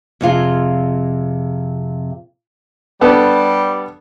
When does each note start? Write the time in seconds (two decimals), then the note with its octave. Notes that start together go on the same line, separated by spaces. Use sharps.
0.21 F2 C3 F4 G#4
3.01 G3 B3 D4 A4